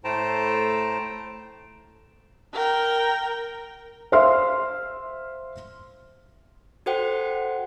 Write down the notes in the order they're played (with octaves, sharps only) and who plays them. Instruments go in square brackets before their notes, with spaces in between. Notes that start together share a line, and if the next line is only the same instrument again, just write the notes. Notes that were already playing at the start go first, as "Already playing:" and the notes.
[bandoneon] A2 A3 C5 G5 A5 A#5
[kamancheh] A#4 G5
[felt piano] C5 E5 F5 C6 F6
[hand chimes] F#4 A4 C5 F#5 G5